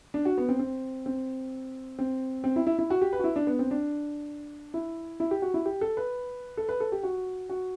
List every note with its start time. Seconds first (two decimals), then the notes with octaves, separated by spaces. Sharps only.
0.14 D4
0.25 F#4
0.38 B3
0.49 C4
0.59 C4
1.06 C4
1.99 C4
2.44 C4
2.56 E4
2.67 E4
2.79 E4
2.90 F#4
3.02 G4
3.13 B4
3.19 F#4
3.24 E4
3.36 D4
3.47 B3
3.59 C4
3.71 D4
4.74 E4
5.20 E4
5.31 G4
5.42 F#4
5.54 E4
5.65 G4
5.81 A4
5.97 B4
6.57 A4
6.69 B4
6.80 A4
6.92 G4
7.03 F#4
7.50 F#4